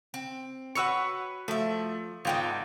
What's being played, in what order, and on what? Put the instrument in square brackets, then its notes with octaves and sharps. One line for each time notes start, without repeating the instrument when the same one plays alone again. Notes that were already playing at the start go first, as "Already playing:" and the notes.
[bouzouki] C4
[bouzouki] F#4 B4 C#5 [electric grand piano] F#5 E6 C#7
[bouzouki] F3 E5 [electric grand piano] A3
[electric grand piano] G#1 G5 [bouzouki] G#3 B3 F4